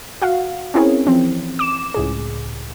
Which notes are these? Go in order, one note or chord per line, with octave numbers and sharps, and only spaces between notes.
F#4 F5 F#5
C4 C#4 E4 G#4 A#4 C#5
E3 F3 C4
D6 E7
C#2 A2 G#4